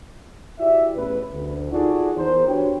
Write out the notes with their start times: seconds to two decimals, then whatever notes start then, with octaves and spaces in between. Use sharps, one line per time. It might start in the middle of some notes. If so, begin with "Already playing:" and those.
0.59 E4 F#4 G4 D5 E5
0.96 A1 E2 B4
1.34 D2
1.72 D#4 F4 F#4 G#4 A4 D5
2.17 E2 A#4 C5
2.48 D4 F#4 G4 B4 C#5 G5